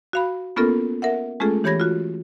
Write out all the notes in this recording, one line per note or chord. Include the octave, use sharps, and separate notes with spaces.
F#4 F5 B5
A#3 B3 C#4 F4 A4 A#4
A#4 E5 F#5
G#3 A3 C#4 F4 G#4 A4
E3 G4 C#5 B5 G#6 A#6
F4 F#4